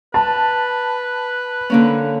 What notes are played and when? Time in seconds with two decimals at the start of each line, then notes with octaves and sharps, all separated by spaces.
0.14 B4 A5
1.70 D3 A#3 C#4